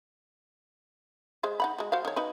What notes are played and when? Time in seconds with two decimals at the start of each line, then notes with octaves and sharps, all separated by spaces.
1.43 G#3 G#4 C5
1.60 D#4 F#5 B5
1.78 G#3 F#4
1.92 F#4 C5 F5
2.05 D#3 C#5
2.16 D#4 F#4 B4